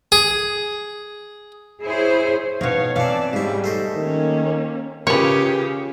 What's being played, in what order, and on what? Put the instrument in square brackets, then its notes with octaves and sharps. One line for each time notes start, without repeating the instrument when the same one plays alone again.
[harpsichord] G#4
[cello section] E4 G#4 C5 C#5
[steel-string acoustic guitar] B2 D#4 [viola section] C#5 F5
[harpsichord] E3 C4 [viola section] D5 A5 [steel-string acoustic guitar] F5
[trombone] G#2 [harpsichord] C#3 E4 [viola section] G3
[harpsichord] A3 C5 D#5
[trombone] D#3 [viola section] A#3 C#4
[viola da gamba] C#3 [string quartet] F4 G4 G#4 [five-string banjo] A#4 B4 [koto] C#5